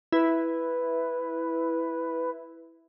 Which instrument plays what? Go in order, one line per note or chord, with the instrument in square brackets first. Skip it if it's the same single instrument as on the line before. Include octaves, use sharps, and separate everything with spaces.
[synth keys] E4 [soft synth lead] B4